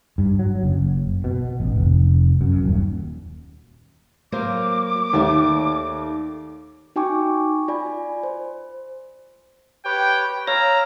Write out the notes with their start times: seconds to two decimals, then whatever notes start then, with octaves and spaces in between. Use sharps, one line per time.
0.18 G2
0.39 F#3
0.63 F#1
1.24 B2
1.60 A1
1.76 F1
2.41 F#2
2.63 D#1
4.32 F#3 A#3 C5 D6
5.13 D#2 A3 G4 D5
6.96 D#4 F#4 G5 G#5 C#6 D6
7.68 F4 D5 G#5 B5
8.23 C5
9.85 G4 B4 C#5 G5
10.47 C#5 F5 A#5 E6